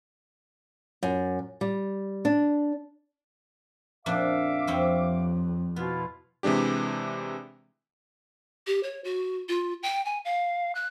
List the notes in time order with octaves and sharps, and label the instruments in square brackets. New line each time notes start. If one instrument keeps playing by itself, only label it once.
[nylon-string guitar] F#2
G3
D4
[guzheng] F2 A#2 D4 [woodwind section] E5 F5 D6
[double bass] F2 [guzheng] G3 C4 C#5
[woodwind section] B2 E4 F4 [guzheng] B3
[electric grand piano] C3 E3 G#3 D4 G4
[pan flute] G4
C#5
F#4
F4
G5
G#5
F5
F#6